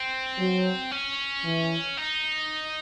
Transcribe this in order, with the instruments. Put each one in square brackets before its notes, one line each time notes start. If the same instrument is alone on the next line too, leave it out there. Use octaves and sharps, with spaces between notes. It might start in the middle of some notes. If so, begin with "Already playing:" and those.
Already playing: [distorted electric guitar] C4
[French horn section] F#3
[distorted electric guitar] C#4
[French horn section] E3
[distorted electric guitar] D#4